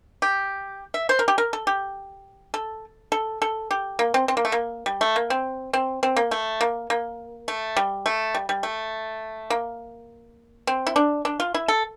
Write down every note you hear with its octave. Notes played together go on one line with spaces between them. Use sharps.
G4
E5
C5
A#4
G4
A#4
A4
G4
A4
A4
A4
G4
A#3
C4
C4
A#3
A3
A#3
G3
A3
A#3
C4
C4
C4
A#3
A3
A#3
A#3
A3
G3
A3
G3
G3
A3
A#3
C4
E4
D4
D4
F4
E4
A4